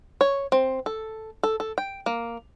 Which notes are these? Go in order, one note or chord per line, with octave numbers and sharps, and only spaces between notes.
C#5
C4
A4
A4
A4
G5
A#3